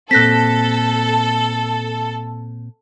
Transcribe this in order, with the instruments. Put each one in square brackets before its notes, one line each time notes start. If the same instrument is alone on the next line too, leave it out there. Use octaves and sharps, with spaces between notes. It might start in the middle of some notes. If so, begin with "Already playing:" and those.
[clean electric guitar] A#2 C4 [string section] A4 [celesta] F#6 A#6 B6